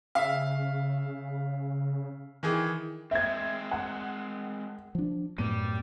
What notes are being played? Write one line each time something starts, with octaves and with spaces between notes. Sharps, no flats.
C#3 E5 F5
D#3 E3 G#4
G#3 C4 E5 G#6
F#5
F3 D4
F#2 A2 G3 B3 D#7